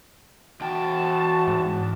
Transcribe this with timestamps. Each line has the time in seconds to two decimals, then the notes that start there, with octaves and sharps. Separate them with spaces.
0.61 E2 F#4 G5 A5
1.48 G#2